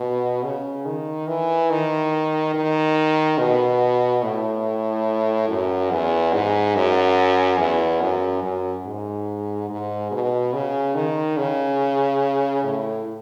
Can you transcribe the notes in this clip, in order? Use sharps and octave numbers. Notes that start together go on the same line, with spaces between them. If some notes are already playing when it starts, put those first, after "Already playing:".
Already playing: B2
C#3
D#3
E3
D#3
D#3
B2
A2
F#2
E2
G#2
F#2
E2
F#2
F#2
G#2
G#2
B2
C#3
D#3
C#3
A2